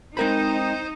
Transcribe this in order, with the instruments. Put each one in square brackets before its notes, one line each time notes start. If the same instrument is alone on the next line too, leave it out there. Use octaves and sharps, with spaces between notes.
[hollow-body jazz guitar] G#3 A#4 B5 [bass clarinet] C4 [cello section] D#4 [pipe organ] C5 G6